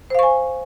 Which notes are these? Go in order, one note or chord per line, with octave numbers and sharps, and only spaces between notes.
C5 F5 G#5 C#6